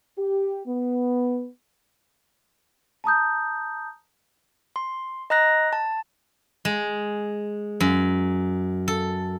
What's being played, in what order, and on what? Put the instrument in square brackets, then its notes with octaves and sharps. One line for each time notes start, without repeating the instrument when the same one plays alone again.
[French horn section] G4
B3
[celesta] A5 A#5 D#6 G6
[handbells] C6
D#5 A#5 F#6 A#6
A5
[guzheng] G#3
F#2
A4